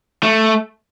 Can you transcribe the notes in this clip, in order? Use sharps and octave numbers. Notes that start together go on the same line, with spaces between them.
A3